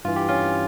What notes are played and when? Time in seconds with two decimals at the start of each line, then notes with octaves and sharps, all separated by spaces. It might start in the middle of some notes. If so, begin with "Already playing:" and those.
0.05 G2 E3 F4
0.16 G4
0.29 C#4 F4